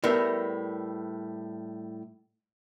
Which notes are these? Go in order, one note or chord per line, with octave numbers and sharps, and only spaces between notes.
A2 G3 B3 A#4 E5